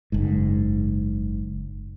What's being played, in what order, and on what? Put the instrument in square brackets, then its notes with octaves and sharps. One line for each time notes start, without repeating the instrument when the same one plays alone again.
[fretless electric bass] F#1 G#2